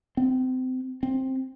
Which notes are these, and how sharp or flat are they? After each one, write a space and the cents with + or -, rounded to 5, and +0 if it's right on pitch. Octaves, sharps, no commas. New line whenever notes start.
C4 -30
C4 +10